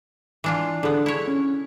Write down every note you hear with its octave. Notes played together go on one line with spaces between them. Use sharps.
E3 D4 F4
D3 B3 D4 G#4 A4
E4 C#5
C#4